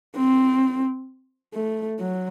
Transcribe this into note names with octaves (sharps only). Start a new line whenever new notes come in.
C4
A3
F#3